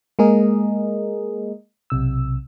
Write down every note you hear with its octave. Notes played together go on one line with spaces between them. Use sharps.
G#3 A#3 G#4 A#4 D#5
B1 C3 E6